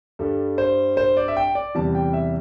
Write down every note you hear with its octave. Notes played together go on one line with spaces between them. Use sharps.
G2 G3 A4
C5
C5
D5
E5
G5
D5
E2 C3 E3 G3 A5
G5
E5